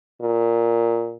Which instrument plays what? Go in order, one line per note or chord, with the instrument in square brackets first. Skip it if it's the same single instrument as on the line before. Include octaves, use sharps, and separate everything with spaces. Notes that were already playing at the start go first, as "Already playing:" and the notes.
[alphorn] A#2